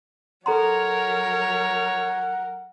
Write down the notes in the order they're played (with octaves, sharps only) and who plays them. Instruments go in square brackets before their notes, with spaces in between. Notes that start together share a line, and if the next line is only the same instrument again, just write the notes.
[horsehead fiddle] F#3 A#4 [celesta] A4 A#5 C6 [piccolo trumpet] C#5 [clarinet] F#5